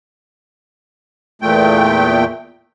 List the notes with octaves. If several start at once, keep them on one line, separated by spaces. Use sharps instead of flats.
E2 A#2 A3 G5